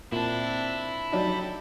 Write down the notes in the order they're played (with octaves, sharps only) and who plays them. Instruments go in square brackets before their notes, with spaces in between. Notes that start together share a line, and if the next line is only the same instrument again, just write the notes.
[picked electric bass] A#2 [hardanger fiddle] C4 D4 [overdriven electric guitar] E4
[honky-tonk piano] F#3 D4 D#4 [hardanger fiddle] G4 A4